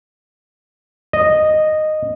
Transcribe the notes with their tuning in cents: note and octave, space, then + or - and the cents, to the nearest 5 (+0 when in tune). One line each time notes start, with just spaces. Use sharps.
D#5 -10